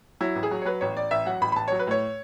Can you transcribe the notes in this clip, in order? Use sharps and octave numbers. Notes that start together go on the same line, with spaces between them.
F#3 E4
A1
G#4
F#3
C#5
F#3 B4
A1 C#5
A1 D5
A1 E5
F#3 F#5
A1 B5
B5
A1 A5
F#3 C#5
B4
A2 C#5